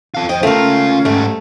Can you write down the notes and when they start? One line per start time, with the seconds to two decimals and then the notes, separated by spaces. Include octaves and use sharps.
0.14 F4 A4
0.29 F2 C5 D#5 G5
0.43 C#2 A3 C#4 F4 A#4
0.57 C#4
1.05 G#2 G3 A3